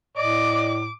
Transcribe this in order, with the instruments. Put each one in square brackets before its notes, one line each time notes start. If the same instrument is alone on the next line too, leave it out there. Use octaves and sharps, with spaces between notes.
[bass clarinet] A2 [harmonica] D5 D#5 [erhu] D6